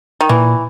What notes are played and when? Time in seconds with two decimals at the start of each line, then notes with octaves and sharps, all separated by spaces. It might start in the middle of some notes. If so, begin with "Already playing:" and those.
0.21 D#3
0.29 A#2 E3